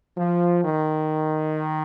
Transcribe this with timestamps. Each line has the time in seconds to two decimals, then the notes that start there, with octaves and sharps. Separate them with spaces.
0.17 F3
0.63 D#3